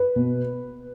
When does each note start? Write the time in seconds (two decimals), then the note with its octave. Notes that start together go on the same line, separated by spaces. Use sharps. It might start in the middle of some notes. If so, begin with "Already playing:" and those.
Already playing: B4
0.16 B2